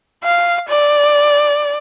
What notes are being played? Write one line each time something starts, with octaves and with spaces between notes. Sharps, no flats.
F5
D5